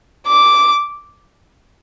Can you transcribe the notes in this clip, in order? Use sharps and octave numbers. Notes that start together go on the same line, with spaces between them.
D6